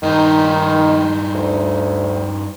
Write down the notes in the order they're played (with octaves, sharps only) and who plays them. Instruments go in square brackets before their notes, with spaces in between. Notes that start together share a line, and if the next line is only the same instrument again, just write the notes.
[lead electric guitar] G2 D#4 [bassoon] D#3
[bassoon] D2